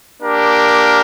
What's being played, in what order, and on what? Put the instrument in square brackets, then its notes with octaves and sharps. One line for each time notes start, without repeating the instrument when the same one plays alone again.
[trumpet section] A#3 D4 G4 A#4